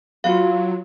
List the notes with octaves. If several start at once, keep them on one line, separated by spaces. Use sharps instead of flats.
F#3 F4 F#4 B4 F5